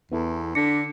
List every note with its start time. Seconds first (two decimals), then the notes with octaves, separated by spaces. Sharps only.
0.12 E2 B3 E4 A4
0.55 D3 D4 D6 A#6 B6 C#7